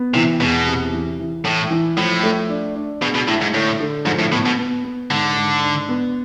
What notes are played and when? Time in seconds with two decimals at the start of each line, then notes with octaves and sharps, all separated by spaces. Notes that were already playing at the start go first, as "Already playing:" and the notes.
Already playing: B3
0.14 C3 E3
0.40 E2 B2
0.66 C3
0.93 E3
1.19 E3
1.44 A2 E3
1.71 E3
1.98 A2 F3
2.23 A3
2.49 D4
2.76 D4
3.01 B2 G#4
3.15 B2
3.28 A2 E4
3.41 G#2
3.54 A2 D3
3.80 D3
4.06 G#2 F3
4.19 A2
4.32 A2 B3
4.45 B2
4.58 B3
4.85 B3
5.10 G#2 D3
5.36 G#2
5.62 D4
5.89 B3